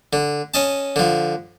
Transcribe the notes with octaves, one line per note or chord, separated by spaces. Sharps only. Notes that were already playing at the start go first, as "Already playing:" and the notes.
D3
C#4 D#5 A5
D3 F3